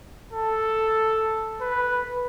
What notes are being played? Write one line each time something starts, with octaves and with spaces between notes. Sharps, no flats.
A4
B4